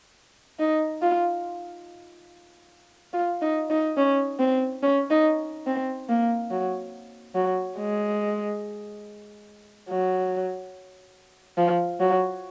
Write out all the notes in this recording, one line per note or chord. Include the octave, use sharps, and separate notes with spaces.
D#4
F4
F4
D#4
D#4
C#4
C4
C#4
D#4
C4
A#3
F#3
F#3
G#3
F#3
F3
F#3